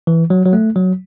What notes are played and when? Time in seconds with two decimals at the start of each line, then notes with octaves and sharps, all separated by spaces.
0.07 E3
0.30 F#3
0.46 F#3
0.53 A3
0.76 F#3